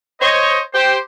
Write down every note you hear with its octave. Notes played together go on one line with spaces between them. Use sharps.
C5 C#5 D#5
G4 C5